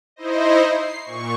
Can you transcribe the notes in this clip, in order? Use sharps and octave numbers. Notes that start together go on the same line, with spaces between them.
D#4 E4 C5 D#5
C7
A#2 C#6